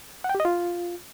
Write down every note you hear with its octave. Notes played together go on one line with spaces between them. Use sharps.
F#5
G5
G4
D#5
F4